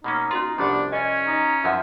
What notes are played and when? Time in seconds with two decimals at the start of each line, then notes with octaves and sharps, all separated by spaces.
0.04 B2 A#3 C#4 D#4
0.31 C#4 F4 F#4 C6
0.58 C2 F3 B3 C#4 D4 G4
0.92 C#4 D#5 G#5
1.27 D#4
1.64 F#2 F3 D#4 E4 E5 F#5